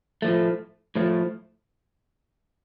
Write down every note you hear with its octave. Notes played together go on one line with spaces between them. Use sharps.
A2 F3 A3
A2 F3 A3